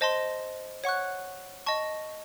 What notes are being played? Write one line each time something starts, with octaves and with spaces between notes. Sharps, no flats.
C5 D#5 A5 C6
C#5 F#5 C#6 F#6
D#5 A5 C#6